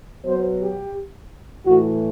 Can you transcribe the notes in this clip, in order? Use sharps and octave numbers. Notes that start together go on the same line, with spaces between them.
B2 F#3 B3 C5
G4
A2 E3 A3 F#4